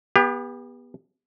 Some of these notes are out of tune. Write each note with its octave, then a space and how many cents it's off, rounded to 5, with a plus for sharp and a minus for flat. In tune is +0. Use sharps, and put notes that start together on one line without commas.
B3 -20 G4 +35